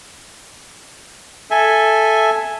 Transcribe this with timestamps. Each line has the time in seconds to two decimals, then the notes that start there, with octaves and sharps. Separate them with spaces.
1.51 A4 E5 G#5